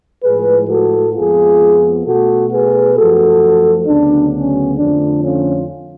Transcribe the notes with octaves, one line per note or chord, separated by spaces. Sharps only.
A2 F3 G#3 G#4 B4
F#4 A4
F2 F3 G#3 B3 F4 G#4
B2 A3 F#4 A4
G#4 B4
F#2 F3 A3 F#4 A4
D2 C#3 F#3 B3 D4
C#4
F2 D3 F3 A3 D4
C#4 F4